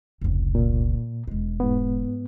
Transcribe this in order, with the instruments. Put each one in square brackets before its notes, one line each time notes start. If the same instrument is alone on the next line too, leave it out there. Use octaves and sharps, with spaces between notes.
[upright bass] F1 C#2
[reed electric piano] A#2
[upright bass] E1 G#3
[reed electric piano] G#2 B3